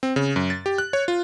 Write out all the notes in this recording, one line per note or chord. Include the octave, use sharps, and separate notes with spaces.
C4
C#3
F#2
A6
G4
F#6
C#5
F4